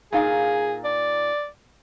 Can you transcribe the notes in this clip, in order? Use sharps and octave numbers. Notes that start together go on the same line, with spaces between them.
A#2 D#4 G#4 F5
D5